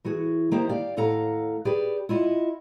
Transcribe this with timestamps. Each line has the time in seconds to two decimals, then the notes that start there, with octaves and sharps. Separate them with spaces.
0.05 E3 F#4 G#4
0.51 D#3 A#3 D#4 E4 G4 C5
0.69 G4 D5 F5
0.96 D#2 A2 A4 F5 F#5 A#5
1.65 G4 G#4 B4 D5
2.09 E4 F4 D#5 F#5